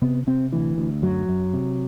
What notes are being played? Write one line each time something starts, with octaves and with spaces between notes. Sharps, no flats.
C3 B3
C3 C4
D2 E3
D2
F#2 F#3
F#2
C3